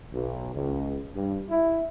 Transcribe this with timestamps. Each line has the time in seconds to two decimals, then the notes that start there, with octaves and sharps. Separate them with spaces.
0.14 B1
0.54 C#2
1.15 G2
1.50 E4